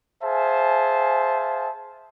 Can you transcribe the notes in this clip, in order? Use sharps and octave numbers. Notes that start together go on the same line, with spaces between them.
G#4 C5 E5 F5 G#5 A5